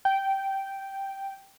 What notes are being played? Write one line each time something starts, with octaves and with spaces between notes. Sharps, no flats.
G5